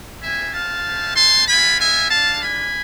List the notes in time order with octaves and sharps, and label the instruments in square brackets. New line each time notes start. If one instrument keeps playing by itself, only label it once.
[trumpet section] A3 C4 F4 E5 G#5
F5 A5
A3 C4 E4
A5 C6
G#3 B3 F4 G#5 B5
E5 G#5
G#3 D4 F4 F5 A5
G#5 B5